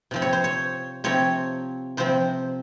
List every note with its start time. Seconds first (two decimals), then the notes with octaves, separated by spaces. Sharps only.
0.11 C3 F3 C4
0.22 C#5
0.33 C5
0.44 C#5
1.04 C3 F3 C4 C#5
1.97 C3 F3 C4 C5